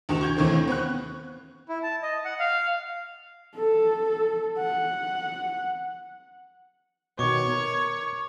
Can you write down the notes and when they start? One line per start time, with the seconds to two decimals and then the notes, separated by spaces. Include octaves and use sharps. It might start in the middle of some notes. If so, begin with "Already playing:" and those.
0.09 D2 D#3 F#4 E7 F7
0.21 C#6 G6 G#6
0.36 D#2 D#3 E3 A3 C4
0.68 B3 C4 C#6 F#6
1.69 E4
1.83 A5
2.03 D#5
2.25 F#5
2.39 F5
3.56 A4
4.58 F#5
7.19 B2 D#3 C#5 C#6 D6
7.52 A#4